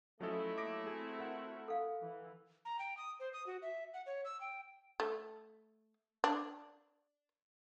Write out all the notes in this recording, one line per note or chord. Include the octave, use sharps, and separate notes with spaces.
F3 F#3 A3 C#4 E4 A4 D#5
F#3 A#3 D6 A#6 D7
C4 F#4 G#4
A#4 F#5
A4 F5
E3
A#5
G5
D#6
C5
D#6
F#4
E5
F#5
C#5
E6
G5
A3
D4